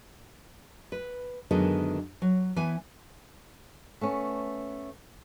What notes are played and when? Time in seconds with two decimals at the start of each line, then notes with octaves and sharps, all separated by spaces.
0.92 B4
1.51 F#2 D3 D#3 G#3 B3
2.22 F#3
2.56 E3 B3 G#5
4.01 A3 B3 C#4